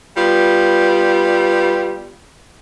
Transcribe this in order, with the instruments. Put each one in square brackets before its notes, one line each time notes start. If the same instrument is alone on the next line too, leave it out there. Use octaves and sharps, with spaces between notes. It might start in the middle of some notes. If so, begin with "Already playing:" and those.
[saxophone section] G3 B3 F4